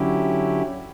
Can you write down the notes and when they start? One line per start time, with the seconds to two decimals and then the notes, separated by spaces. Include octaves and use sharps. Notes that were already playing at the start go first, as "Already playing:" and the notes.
Already playing: D3 F#3 C#4 E4 G4